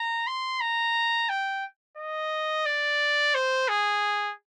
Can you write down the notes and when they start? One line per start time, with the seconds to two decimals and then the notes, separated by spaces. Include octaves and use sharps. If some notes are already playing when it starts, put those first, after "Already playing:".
Already playing: A#5
0.27 C6
0.61 A#5
1.29 G5
1.97 D#5
2.66 D5
3.35 C5
3.69 G#4